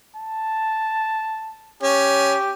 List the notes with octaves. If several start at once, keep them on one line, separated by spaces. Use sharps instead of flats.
A5
C#4 G4